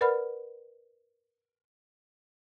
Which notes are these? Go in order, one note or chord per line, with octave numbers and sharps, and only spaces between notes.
A#4 B4 D5 F#5 B5 F6